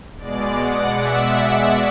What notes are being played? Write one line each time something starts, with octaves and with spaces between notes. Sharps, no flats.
B2 G#3 D5
F#5
E5